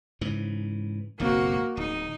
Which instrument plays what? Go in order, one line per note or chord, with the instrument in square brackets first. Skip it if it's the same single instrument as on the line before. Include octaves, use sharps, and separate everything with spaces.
[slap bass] G#2 C#3 E3
[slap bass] F#1 B1 C4 [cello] A#3 F#4
[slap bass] D1 [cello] D#4